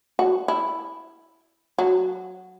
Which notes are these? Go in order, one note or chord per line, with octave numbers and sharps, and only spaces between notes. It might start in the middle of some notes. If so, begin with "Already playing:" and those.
F#4
E4
F#3